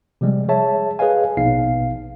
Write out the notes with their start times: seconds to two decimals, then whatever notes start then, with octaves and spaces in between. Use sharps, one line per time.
0.21 C3 F3 G3 G#3
0.48 G#4 C#5 E5 A5
0.99 G#4 B4 C#5 D#5 F5 G#5
1.37 A#1 B2 B3 D#4 F5 C7